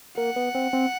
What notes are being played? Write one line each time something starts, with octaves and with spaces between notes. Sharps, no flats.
A#3 F#5
B3
C4
C4